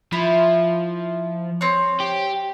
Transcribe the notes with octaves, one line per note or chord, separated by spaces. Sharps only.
F3 E4
C4 C#5
G4